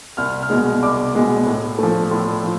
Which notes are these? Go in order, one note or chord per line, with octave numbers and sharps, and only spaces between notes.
C2 F6
F6
B2 G#3
C2 D6
B2 G#3
A2
F3 A3
A2 C6
F3